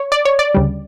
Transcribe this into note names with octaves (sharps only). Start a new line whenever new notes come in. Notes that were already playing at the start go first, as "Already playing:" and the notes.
Already playing: C#5
D5
C#5
D5
D2 C#3 G3